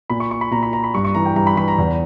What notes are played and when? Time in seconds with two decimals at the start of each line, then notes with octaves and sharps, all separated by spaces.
0.10 A#2 B5
0.20 C#6
0.31 C#6
0.41 B5
0.51 A#2 A#5
0.63 B5
0.73 A#5
0.84 B5
0.94 G2 C#6
1.05 C#6
1.15 E3 A#5
1.26 G5
1.36 G2 A#5
1.47 B5
1.57 E3 B5
1.68 A#5
1.78 E2